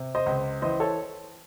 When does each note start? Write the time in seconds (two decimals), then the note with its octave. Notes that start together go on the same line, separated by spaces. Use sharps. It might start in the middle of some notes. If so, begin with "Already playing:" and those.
Already playing: C3
0.15 C5 D#5
0.26 C#2
0.62 E3 C5 D#5
0.80 A4 C#5